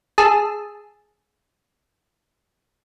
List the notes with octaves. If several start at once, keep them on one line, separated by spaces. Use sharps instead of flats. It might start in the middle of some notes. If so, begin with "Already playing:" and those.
G#4 A5 E6